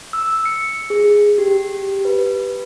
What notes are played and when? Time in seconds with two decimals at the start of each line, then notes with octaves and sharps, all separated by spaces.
0.13 E6
0.45 C#7
0.90 G#4
1.38 G4
2.05 B4